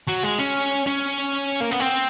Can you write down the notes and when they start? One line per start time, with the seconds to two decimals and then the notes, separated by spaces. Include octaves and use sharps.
0.08 F#3
0.24 G#3
0.39 C#4
0.87 C#4
1.61 A#3
1.71 B3
1.80 C4